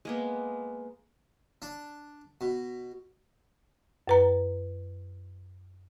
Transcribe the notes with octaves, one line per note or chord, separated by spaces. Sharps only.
G#3 A#3 B3
D4
B2
F#2 B4 A#5